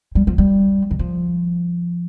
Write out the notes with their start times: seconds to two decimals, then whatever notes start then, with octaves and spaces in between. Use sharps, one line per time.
0.15 G3
0.27 F3
0.38 G3
0.91 D#3
0.99 F3